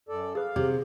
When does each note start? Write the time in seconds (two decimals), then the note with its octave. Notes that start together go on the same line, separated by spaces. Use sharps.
0.09 F#2 A4 D5
0.35 G#4 B4 F5
0.56 C3 G4 G#4